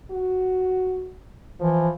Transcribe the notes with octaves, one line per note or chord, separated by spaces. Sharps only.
F#4
E3 F3